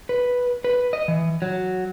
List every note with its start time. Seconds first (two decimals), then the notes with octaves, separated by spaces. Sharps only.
0.09 B4
0.64 B4
0.93 D#5
1.08 E3
1.42 F#3